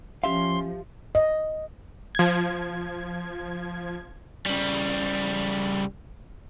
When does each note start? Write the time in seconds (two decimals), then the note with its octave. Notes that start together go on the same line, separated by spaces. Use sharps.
0.24 F3 C#4 G4 E5 F5 C6
1.15 D#5
2.15 F3 G#6
4.46 C#3 G3